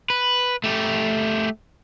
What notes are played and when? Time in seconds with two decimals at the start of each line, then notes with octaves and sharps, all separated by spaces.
0.10 B4
0.64 A3 G4